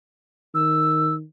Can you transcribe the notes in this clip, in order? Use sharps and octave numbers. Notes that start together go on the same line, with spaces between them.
D#3 E6